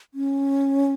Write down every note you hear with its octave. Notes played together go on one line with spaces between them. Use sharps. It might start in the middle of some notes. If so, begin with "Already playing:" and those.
C#4